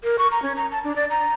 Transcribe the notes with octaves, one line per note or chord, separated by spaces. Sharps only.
A#4
C#6
A#5
C#4
A#5
A5
D4
D5
A#5